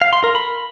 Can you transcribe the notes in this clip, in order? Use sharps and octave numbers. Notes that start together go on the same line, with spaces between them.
F5
C6
A#4
B5